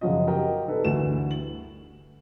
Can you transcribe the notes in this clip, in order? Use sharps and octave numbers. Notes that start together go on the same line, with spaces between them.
F#2 C#3 F3 F#3 F#4 D#5
F#4 G4 A#4 D#5 G5
C2 A4 B4 D5
D2 G2 E3 E4 F#4 E7
F#7